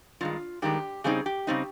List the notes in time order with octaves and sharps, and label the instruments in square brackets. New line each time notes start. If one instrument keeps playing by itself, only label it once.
[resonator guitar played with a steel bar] G2 D#3 G#3 F4
G2 D#3 G#3 G4
C#3 G3 C4 D#4 G#4
G4
C#3 G3 C4 D#4